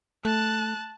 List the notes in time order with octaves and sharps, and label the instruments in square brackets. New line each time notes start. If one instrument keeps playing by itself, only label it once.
[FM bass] A3 [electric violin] A5 F#6